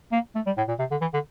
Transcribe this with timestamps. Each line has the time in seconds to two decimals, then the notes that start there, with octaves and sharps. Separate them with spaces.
0.12 A#3
0.35 A3
0.46 G3
0.58 A2
0.68 A#2
0.79 C3
0.91 D3
1.01 E3
1.14 D3